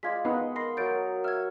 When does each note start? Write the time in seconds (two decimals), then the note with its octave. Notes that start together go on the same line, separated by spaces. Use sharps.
0.03 G#3 F4 D5 D#5 G#6 B6
0.25 B3 D#4 B4 D#5 F5 F#5 B5
0.56 A#4 B5 C6 A#6 C7
0.77 F#3 A#4 C#5 G6 A6 D7
1.24 E5 F6 G#6